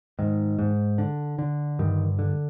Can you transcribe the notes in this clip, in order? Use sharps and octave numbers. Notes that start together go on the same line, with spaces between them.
G#2 D#3
G#2
D3
D3
G2 D#3
D3